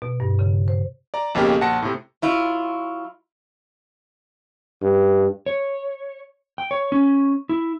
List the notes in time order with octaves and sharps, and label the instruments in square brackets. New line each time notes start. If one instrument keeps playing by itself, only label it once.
[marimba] B2
G2
C#3
C5
[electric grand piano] D5 A#5
B1 F2 C#3 A#3 G4
A#1 F#5 A5 A#6 C#7
A2 C3
[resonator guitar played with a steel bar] F#3 E4 F4
[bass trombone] G2
[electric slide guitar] C#5
G5
C#5
C#4
E4